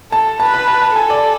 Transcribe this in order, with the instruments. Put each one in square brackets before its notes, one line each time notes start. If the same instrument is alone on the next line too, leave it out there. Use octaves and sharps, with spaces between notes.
[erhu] A4 [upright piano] A5
[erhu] B4 [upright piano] A5
[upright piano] B5
A5
A5
[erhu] A4 [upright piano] G#5
[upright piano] D5